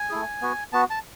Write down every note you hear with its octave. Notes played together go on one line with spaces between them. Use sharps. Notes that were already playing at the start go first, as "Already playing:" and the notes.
Already playing: G#5
A3 E4 G#4
B3 F#4
B3 F#4 A5
A5